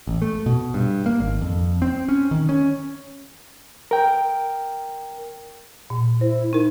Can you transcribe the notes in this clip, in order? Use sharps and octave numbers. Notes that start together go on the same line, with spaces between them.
A1
A3
B2
G2
A#3
G#1
F2
C4
C#4
D#3
C#4
A#4 G5
A#2
E4 C5
D#4 E4 A#4